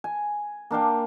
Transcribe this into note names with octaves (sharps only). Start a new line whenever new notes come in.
G#5
A#3 D4 F5 G5